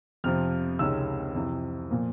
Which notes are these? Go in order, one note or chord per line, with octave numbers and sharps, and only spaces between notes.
F2 C3 F3 F6
C#2 C3 D#3 G#3 C#4 E6
F2 C3 E3
A#2 F3 A#3